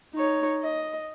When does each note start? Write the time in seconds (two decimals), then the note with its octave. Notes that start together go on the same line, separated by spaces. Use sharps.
0.14 D#4 C#5
0.63 D#5